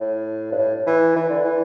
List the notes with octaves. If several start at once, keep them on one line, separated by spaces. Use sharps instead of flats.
A2
G2
A2
E3
E3
D3
E3